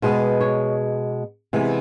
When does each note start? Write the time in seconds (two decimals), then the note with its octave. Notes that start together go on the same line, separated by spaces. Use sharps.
0.02 B2 G#3 B3 C5
0.41 C#5
1.53 C3 E3 G#3 B3